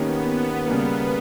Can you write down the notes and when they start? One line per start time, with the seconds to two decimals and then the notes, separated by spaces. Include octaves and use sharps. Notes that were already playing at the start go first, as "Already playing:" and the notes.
Already playing: D#3 A#3 B3 C#4 G4
0.67 C#3 G3 A#3 B3